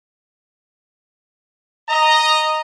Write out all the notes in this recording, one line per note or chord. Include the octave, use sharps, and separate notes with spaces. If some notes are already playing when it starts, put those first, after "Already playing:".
D#5 A#5